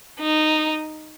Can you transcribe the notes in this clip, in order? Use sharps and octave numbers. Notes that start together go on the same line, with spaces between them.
D#4